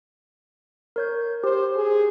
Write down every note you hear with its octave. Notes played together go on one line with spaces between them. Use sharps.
A#4 C#5 G6
G4 C5
G#4